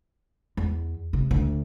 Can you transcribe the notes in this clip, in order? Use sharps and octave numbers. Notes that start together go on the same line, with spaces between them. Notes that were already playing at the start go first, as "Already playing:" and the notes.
E2
C3
D2